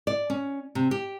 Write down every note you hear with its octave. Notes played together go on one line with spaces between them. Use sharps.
D5
C#4
C3
G4